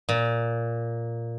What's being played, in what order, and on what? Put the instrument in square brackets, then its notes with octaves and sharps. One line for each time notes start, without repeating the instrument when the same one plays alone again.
[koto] A#2